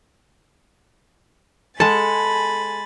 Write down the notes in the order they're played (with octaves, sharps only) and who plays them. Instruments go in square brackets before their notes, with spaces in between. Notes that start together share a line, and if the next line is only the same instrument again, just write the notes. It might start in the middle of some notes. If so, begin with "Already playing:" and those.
[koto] G#3 F#5 A5 [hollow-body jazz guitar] A4 [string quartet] G#5 B5 A6